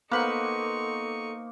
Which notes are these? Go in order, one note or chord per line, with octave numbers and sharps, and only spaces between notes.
A#3 B3 D#4 A4 B4 C5 F#5 C#6